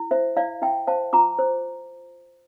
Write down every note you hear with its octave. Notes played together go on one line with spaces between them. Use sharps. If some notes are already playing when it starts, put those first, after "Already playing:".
Already playing: E4
C5 E5
E4 D5 F5
E4 E5 G5
C5 F5 A5
F4 A#5 D6
C5